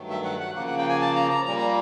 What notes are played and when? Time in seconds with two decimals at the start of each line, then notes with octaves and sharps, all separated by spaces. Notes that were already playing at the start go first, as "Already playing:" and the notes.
Already playing: G2 D#3 F#3 A3
0.10 E5
0.25 F#5
0.40 F#5
0.55 C#3 F3 A#3 F#5
0.67 F#5
0.78 G5
0.89 G#5
1.01 A5
1.16 A#5
1.31 A#5
1.46 A#2 G3 A#3 A#5
1.58 A#5